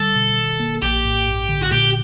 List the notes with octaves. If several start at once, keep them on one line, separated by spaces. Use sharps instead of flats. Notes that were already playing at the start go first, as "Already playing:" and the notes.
Already playing: D3 G3 A4
B2
D#3
A#3
A#1 G4
A2
G2
D3
F#4
A#2 G4